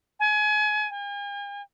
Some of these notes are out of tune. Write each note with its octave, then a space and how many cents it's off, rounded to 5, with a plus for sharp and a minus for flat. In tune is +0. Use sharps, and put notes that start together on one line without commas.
G#5 +30
G#5 -45